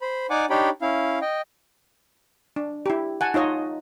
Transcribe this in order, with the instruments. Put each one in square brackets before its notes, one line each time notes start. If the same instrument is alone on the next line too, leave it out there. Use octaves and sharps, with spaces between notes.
[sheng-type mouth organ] C5 B5
D#4 D5 F#5 G#5 D6
D4 D#4 G4 C#5 G5 B5
C#4 E4 F5
D#5 G5
[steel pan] D4
E4 G4
F#5 G#5 A5
D#4 F4 C#5 D#5